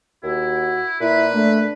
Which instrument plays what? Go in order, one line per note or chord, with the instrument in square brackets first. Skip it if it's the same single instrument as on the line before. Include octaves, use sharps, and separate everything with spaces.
[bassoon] D#2 [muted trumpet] E4 [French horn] F#4
[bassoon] A#2 [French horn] E4 [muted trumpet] B4
[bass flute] A3 [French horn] D4